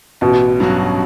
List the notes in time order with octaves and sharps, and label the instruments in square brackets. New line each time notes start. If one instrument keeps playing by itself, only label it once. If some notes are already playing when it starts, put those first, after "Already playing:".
[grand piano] A1 [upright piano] B2
[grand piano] G2 F#3 C#4 F#4